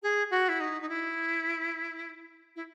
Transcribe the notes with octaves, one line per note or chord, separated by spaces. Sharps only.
G#4
F#4
E4
D#4
D#4
E4
E4